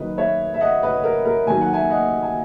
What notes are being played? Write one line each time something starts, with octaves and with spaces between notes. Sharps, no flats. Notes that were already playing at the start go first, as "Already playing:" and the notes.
Already playing: F#1 F#2 D#3 F#3 B4 D#5
C#5 E5
E5
D#5 F#5
B4 D#5
A#4
A#4
D#2 D#3 F#3 G#5
F#5
E5 G#5
D#5 F#5
G#5